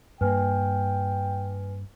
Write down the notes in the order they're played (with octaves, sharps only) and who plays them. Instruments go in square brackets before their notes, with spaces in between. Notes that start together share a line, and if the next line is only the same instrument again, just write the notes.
[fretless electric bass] G2 A#3 [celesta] B4 G#5 F6 [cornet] G5